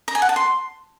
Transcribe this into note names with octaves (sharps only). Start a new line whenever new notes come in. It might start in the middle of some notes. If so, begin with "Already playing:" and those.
A#5
G#5
F#5
A5
C6